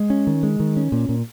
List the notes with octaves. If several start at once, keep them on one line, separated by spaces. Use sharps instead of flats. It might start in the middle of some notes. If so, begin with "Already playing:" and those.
Already playing: G#3
C#4
D#3
G#3
D#3
C#4
A#2
A#2